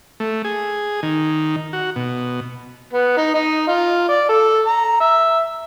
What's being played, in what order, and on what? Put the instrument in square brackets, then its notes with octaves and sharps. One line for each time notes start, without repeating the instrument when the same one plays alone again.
[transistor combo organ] A3
G#4
D#3
F#4
B2
[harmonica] B3
D#4
D#4
F4
D5
A4
A#5
E5